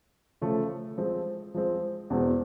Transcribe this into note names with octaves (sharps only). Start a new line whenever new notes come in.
C#3 F3 A3
F3 G#3 C4
F3 G#3 C4
E2 B2 G#3 C4